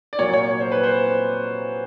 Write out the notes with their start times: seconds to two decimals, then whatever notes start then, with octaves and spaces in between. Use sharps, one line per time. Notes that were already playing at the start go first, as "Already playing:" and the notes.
0.13 D5
0.19 C2 A#2 F#3 A#3 C#5
0.33 C#5
0.48 C#5
0.60 C5
0.72 B4
0.84 C5